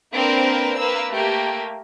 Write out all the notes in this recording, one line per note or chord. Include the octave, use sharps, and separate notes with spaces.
A#3 C4 D4 A#4 B4
A#3 B4 E6
A3 A#3 G4